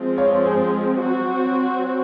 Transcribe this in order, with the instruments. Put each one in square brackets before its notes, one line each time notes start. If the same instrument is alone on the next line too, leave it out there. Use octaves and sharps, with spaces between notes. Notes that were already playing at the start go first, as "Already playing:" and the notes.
Already playing: [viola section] F3 G#3 C4
[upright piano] C#5 F5
G#4 C5
[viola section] F#3 C4 F#4 C5